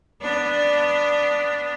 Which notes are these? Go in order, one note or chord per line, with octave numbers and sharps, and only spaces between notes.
B3 D4